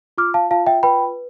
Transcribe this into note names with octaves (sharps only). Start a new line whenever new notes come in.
F4 D6 F6
F5 A5
F4 F5 A5
E5 G5
B4 G5 B5